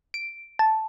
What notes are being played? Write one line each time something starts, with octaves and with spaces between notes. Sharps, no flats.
D7
A5